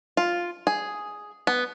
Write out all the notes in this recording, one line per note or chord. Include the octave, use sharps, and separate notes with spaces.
F4
G#4
B3